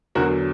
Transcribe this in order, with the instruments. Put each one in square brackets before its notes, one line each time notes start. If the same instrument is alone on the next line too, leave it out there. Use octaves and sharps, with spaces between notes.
[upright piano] E2 D3 F#3 F#4 A#4